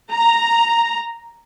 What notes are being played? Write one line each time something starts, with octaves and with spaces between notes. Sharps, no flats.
A#5